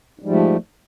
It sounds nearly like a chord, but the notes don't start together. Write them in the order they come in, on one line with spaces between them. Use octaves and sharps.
G#2 G3 F3 A3